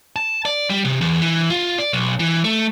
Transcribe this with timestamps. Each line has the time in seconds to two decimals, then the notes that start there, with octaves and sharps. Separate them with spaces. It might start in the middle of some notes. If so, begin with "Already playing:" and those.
0.16 A5
0.45 D5
0.70 G3
0.85 C3
1.01 E2
1.22 E3
1.50 F4
1.79 D5
1.93 B1
2.20 E3
2.44 A3